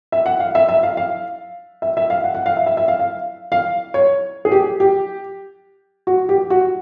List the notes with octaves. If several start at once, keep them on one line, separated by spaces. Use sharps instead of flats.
E5
F#5
F5
E5
E5
F5
F5
E5
E5
F5
F#5
F#5
F5
E5
E5
E5
F5
F5
F5
C#5
G#4
G4
G4
F#4
G4
F#4